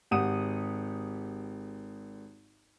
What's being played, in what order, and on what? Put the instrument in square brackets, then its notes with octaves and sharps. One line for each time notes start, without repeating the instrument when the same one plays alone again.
[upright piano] G#1 G4 F#5 D#6 D#7